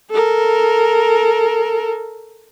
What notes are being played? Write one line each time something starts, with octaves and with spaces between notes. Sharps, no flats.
A4 A#4